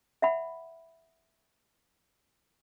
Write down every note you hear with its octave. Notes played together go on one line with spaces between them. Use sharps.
E5 F#5 B5